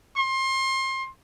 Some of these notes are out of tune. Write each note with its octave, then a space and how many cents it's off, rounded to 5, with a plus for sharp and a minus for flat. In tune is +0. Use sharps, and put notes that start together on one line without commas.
C6 +30